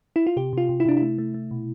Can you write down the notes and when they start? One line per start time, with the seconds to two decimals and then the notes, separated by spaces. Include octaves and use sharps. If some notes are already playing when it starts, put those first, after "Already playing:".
0.16 E4
0.27 F4
0.37 C3 G4
0.53 C3 F4
0.69 C3
0.80 E4
0.85 C3 D4
0.97 E4
1.02 A3
1.18 A3
1.34 A3
1.51 B2